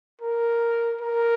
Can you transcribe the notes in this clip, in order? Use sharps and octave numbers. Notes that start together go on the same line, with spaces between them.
A#4
A#4